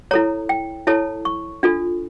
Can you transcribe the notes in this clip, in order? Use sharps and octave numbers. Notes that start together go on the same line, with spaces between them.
E4 A4 C#5 A#5
G5
E4 A4 C#5 A5
C#6
D4 F4 A4